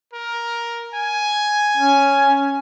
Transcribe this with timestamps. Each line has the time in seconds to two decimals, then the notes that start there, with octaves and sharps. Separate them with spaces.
0.13 A#4
0.94 G#5
1.77 C#4